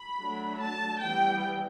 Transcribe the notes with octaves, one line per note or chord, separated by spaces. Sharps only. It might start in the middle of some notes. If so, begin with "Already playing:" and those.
Already playing: B5
F#3 A3 D4
A5
E3 G3 B3 G5